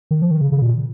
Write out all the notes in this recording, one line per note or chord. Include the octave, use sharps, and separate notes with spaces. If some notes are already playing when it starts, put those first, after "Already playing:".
D#3
F3
D#3
C#3
C#3
A#2